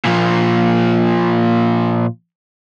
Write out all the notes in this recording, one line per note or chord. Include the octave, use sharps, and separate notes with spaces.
A#2 F3